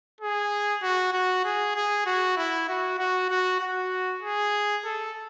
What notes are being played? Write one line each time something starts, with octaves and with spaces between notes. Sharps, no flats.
G#4
F#4
F#4
G#4
G#4
F#4
E4
F#4
F#4
F#4
F#4
G#4
A4